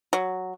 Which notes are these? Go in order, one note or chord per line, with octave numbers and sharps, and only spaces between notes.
F#3